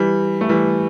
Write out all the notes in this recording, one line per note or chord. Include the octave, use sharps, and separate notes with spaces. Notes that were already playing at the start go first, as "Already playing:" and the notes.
Already playing: E3 G3
A3
E3 G3